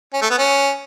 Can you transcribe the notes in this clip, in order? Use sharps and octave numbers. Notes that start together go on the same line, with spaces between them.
C#4
A3
B3
C#4